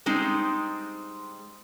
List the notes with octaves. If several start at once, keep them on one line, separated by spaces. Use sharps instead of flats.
G3 G#3 C4 D#4